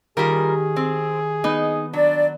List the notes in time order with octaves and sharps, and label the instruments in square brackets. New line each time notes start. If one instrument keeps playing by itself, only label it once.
[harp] D#3 G4 [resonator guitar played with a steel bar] G3 F4 A#4 [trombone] G#4
[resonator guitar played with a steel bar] C4
[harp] B3 [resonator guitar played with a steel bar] D#4
[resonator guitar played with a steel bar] F#3 [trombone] D4 [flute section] D5